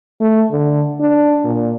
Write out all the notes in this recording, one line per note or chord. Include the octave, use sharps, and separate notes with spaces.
A3
D3
D4
A#2